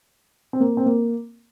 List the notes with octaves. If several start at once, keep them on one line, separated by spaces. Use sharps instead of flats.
C4
A#3
C4
A#3